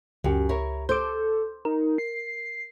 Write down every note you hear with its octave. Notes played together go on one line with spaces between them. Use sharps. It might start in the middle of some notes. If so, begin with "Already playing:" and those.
C#2 F#2 G4
E4 A#4 C#5
A4 C5 D6 G6
D#4 A#4
C7